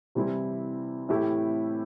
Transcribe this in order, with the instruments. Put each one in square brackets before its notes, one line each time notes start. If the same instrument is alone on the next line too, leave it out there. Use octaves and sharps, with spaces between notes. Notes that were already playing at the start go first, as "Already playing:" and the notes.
[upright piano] C3 E3 G3 C4 E4
A2 E3 A3 E4 G4